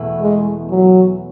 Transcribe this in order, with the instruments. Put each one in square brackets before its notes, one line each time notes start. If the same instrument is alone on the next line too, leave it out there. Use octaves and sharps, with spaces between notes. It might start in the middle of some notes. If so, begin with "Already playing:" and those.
Already playing: [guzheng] E2 B2 A3 E4
[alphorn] G#3
F#3